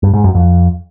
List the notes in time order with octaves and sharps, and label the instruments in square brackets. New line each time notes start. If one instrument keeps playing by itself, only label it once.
[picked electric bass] G2
G#2
F#2
F2